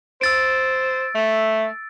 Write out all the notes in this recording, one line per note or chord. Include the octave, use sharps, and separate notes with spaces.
C5 E6 A6 D7
A3